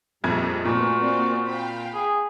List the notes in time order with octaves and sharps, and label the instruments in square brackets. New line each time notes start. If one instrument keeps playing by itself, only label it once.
[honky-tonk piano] A#1 F2 G#6 [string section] A#2 G3 D#4
[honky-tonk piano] A#2 [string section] A3 B4 [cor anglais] F#4
[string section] A#3 C4 D5
F5 G5 B5
[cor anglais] G#4